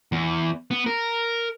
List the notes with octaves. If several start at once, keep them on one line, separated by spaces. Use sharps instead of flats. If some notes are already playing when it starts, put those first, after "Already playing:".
E2
B3
A#4